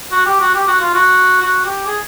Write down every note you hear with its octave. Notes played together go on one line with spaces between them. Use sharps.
F#4
G4
F#4
G4
F#4
F4
F#4
F#4
G4
G#4